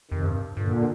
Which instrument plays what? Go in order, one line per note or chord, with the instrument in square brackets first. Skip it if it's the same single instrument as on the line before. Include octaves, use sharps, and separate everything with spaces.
[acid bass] F2 [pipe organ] C3 D#3
[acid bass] G2
[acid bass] G2 [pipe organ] A#2 D3